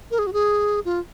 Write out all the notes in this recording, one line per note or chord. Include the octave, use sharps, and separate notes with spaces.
A#4
G#4
F#4
G#4
F4